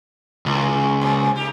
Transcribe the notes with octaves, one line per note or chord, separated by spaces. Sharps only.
C#2 G#2 D#3 E3
A2 C4
A3 D#4 G4